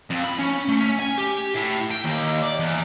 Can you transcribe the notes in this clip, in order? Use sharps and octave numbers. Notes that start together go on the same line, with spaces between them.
F2
B5
C#4
A3
C#4
G#5
G4
A2
G5
D#2
D5
E2